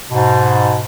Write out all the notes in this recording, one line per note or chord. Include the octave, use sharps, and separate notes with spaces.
G#2 B2